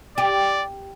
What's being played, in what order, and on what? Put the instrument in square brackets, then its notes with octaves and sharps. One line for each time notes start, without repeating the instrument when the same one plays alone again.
[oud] G4 [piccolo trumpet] D5